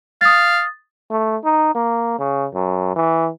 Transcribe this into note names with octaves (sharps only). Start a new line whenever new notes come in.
F5 D#6 A6
A3
D#4
A#3
C#3
F#2
E3